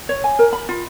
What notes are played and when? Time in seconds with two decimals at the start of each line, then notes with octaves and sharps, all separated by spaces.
0.09 C#5
0.24 G#5
0.39 A#4
0.53 B5
0.69 F4